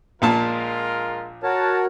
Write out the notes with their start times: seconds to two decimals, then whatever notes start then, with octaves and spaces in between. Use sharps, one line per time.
0.22 A#1 A#2 G#3 F4 A#4 A5
1.43 F#4 A#4 C#5 A5